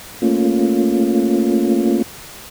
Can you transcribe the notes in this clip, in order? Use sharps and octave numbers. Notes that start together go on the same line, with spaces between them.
A3 A#3 C#4 F4